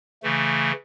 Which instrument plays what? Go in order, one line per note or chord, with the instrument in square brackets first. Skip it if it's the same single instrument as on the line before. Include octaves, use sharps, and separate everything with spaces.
[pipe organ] C#3 E3 A3